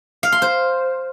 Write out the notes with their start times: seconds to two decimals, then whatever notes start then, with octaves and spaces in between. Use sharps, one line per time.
0.23 F5
0.32 C6
0.42 C5